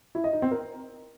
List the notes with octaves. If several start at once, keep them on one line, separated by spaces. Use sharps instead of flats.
E4
D#5
D#4
C4
A#4